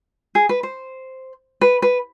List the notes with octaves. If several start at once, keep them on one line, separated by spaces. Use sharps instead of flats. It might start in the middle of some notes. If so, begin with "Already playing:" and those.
G#4
B4
C5
B4
B4